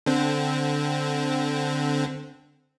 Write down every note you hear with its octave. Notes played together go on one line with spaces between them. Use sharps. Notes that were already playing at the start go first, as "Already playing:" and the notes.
D3 C4